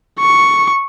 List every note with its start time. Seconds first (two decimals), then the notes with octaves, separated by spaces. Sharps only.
0.20 C#6